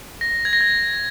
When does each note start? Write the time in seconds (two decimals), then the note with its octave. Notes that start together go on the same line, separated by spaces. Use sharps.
0.21 A#6
0.45 G#6
0.53 A#6
0.61 G#6